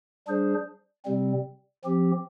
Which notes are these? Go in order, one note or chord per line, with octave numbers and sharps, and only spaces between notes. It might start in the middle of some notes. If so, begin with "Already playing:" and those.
G3 D4 G#4 C5
C3 G3 C4
F3 C4 G4